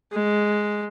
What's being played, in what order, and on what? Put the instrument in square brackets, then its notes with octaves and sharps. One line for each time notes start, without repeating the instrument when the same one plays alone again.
[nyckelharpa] G#3